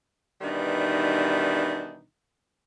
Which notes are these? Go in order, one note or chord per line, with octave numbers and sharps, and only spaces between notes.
B2 D#3 E3 G3 D4 D#4